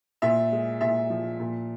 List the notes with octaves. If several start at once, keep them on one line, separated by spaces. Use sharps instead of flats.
A#2 E5
G#3
A#2 E5
F3
A#2